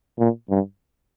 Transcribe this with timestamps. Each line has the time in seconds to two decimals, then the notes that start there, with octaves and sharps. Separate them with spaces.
0.19 A#2
0.50 G2